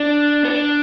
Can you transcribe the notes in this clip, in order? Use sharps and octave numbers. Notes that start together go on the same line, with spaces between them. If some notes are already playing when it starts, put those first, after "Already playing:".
Already playing: D4
B3
D4